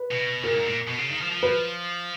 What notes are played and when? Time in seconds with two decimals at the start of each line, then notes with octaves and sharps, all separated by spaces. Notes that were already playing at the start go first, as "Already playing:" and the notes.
Already playing: B4
0.11 B2
0.43 A#2 A#4
0.55 G#2
0.65 A#2
0.87 B2
0.99 C#3
1.10 D#3
1.21 F3
1.31 F3
1.43 B4